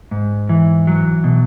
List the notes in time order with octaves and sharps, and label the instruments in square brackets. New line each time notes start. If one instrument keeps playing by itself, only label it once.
[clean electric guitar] G#2
E3
F#3
B2